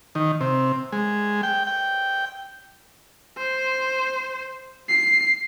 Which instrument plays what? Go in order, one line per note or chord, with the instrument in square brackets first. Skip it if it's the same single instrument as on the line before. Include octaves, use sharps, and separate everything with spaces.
[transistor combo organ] D#3
C3
G#3
G5
G5
[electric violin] C5
C7